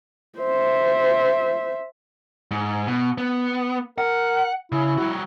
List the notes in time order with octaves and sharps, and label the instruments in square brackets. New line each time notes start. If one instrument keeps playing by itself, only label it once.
[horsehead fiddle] C5 E5
[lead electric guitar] G#2
B2
B3
[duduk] A#4 [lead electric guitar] F#5
[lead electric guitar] C#3 [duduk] E4
[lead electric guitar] G3 F#4